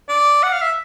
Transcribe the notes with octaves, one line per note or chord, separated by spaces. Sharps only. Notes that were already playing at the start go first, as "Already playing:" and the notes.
D5
F#5
F5
E5